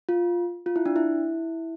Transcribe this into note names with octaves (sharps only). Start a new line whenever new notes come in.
F4
F4
E4
D4
E4